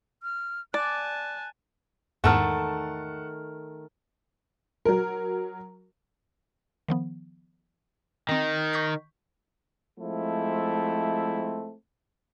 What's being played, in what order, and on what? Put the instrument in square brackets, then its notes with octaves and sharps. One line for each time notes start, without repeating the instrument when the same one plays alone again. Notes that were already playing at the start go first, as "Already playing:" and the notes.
[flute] F6
[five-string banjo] D5 [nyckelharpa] G#5 A5 [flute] F#6
[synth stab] E2 G#2 [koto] D#3 A3 [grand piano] F#5 A5 F6
[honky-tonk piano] F#3 A#4
[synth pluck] D#3 F3 B3
[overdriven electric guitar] D#3 [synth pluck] C4 G5
[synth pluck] C#6 G6 B6
[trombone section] F3 G#3 A3 C4 E4